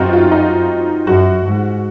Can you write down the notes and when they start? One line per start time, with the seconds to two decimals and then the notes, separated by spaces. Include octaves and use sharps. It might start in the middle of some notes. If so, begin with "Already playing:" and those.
Already playing: F#2 C4 D#4 F4 F#4
0.13 F4
0.32 D#4
1.07 F#2 F#4
1.45 G#2